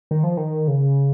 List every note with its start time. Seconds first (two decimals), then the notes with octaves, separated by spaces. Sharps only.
0.11 D#3
0.24 F3
0.37 D#3
0.68 C#3